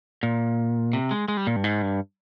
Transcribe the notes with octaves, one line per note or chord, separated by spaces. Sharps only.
A#2
C3
G#3
G#3
G3
A#2
G2
G#2
G2